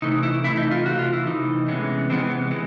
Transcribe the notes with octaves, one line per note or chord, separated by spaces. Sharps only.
C3 E3 A3 D#4
E4
C3 E3 A3 E4
D#4
F4
C3 E3 A3 F#4
F4
E4
C3 E3 A3 D#4
C3 E3 G#3 B3 C#4
C3 E3 G#3 B3 C4
B3
C3 E3 G#3 B3